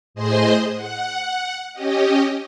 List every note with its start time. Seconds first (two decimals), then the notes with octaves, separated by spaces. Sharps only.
0.14 A2 G#4 C5 D#5 C6
0.74 F#5
1.73 C#4 G4 D#5